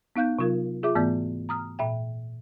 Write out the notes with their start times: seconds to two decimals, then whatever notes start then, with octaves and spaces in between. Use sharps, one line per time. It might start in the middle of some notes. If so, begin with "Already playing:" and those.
0.16 B3 D#4 F5 F#6 G6
0.39 C3 F#3 F4 A#4
0.83 F4 G#4 E5 D6
0.95 G#2 E3 A3 B3 D5 G6
1.49 A#5 D#6 F6
1.79 A#2 E5 G5